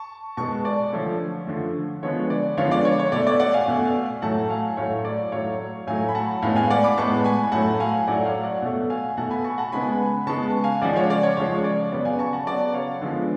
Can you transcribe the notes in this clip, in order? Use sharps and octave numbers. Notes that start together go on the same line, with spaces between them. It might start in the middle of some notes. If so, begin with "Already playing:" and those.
Already playing: A5 C#6
B2 G#3 B3 A5 C#6
D5
D3 F3 A3 C#5
D3 F3 A3
D3 F3 G#3 B3 C#5
D5
D3 F3 G#3 B3 C#5 F5
D5
C#5
C#5
B2 A3 D5
D5
D5 F#5
F5 G#5
B2 A3
A2 F#3 A3 F#5 A5
F5 G#5
A2 F#3 A3 C#5 F5
D5
A2 F#3 A3 C#5 F5
A2 F#3 A3 F5 G#5
B5
F#5 A5
A2 G#3 B3 F5 G#5
F5 G#5
D5 F#5
B5 D6
A2 G#3 B3 A5 C#6
G#5 B5
A2 F#3 A3 F#5 A5
F5 G#5
A2 F#3 A3 D5 F#5
C#5 F5
D5 F#5
B2 A3
F5 G#5
B2 A3 F#5 A5
G#5 B5
A5 C#6
F#5 A5
C#3 G#3 B3 G#5 B5
C#3 G#3 B3 A5 C#6
F5 G#5
C#3 F3 G#3 D5 F#5
C#5 F5
D5
C#5
C#3 F3 G#3 C#5
D5
C#3 F#3 B3 D5
F5 G#5
A5 C#6
F#5 A5
C#3 F#3 B3 D5
C#5 F5
D3 F3 G#3 B3